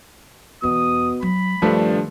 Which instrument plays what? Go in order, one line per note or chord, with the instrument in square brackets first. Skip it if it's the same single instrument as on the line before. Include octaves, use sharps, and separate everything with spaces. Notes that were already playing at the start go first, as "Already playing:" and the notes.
[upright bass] E2 [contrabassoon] B2 [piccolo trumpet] D#6
[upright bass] F#3 [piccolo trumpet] B5
[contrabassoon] G2 [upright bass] D#3 [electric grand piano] F3 A3 D4